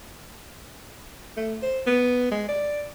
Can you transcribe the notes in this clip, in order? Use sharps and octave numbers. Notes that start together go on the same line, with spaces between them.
A3
C5
B3
G#3
D5